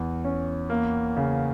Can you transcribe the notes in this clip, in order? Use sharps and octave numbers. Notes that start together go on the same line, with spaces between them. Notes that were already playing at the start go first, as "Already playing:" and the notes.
Already playing: E2
C#4
A#3
C#3